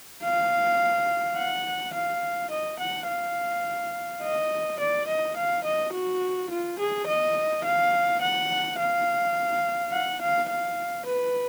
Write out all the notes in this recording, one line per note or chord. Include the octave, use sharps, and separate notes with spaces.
F5
F#5
F5
D#5
F#5
F5
D#5
D5
D#5
F5
D#5
F#4
F4
G#4
D#5
F5
F#5
F5
F#5
F5
F5
B4